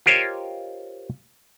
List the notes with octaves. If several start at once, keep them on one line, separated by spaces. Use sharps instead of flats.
F4 G4 A#4 C5 C#5 D#5